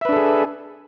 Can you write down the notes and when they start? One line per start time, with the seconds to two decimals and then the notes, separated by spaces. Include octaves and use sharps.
0.01 E5
0.05 B4
0.09 D4
0.13 A4
0.16 G#4